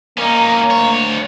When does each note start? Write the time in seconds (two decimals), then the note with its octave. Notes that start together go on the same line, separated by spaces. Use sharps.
0.18 A#3 C#4 D#4
0.71 D2 C#5